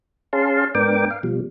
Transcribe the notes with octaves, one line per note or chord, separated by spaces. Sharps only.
C#4 G#4 F5 A5 C6
G#2 B3 D4 A#4 G5 D6
F5
B2 F3 G3